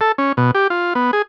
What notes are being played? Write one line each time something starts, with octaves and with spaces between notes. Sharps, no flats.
A4
C#4
B2
G4
F4
B3
G#4